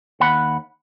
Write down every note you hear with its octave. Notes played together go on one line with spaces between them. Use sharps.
D#2 F#5 B5